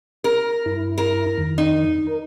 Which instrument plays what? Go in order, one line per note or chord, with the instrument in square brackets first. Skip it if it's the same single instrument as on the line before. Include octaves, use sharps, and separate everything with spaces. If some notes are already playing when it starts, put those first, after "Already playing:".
[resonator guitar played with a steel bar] A#4
[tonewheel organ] G2 E4
[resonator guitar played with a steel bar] A#4
[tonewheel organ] F2 D#3
[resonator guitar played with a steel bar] D#4
[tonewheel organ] A#4